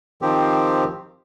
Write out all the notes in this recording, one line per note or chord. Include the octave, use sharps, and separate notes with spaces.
D#3 F3 C4 G4